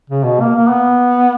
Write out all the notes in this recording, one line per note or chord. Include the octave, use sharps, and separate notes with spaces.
C#3
B2
A#3
A#3
B3